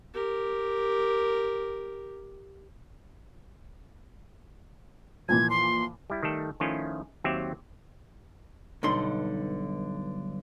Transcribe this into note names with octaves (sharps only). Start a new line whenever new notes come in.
G4 A#4
A#2 E3 F3 G#6
C6
G3 E4
D#3 G3 A3 A4
D#3 F3 A3 C#4 E4 F4
D#2 F#3 C4 G4 C5 E5
B1 G2 D3 D#4 C6